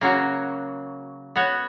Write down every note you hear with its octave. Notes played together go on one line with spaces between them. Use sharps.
C#3 F#3 A#3 C#4 F#4
B3 F#4 C#5